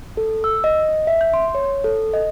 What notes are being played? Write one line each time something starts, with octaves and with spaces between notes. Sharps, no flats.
A4
E6
D#5
E5
G6
C6
C#5
A4
D#5